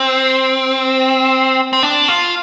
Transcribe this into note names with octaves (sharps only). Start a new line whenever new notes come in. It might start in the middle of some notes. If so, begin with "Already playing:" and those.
Already playing: C4
C4
D4
F4